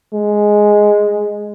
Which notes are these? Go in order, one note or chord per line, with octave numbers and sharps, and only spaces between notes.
G#3